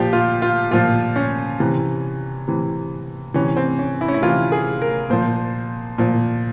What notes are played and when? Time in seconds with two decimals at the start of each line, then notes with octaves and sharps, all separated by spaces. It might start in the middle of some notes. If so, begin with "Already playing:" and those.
Already playing: A#2 F3 G4
0.13 F4
0.42 F4
0.71 A#2 F3 F4
1.16 C#4
1.60 C3 E3
2.48 C3 E3
3.34 C3 E3 C#4
3.56 C4
3.79 C#4
4.01 E4
4.08 C#4
4.14 E4
4.22 C3 E3 F4
4.52 G#4
4.82 A#4
5.10 A#2 F3 C5
5.98 A#2 F3